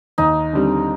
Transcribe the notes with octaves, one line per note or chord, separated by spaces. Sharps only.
D#2 D#4
D3 G3 C4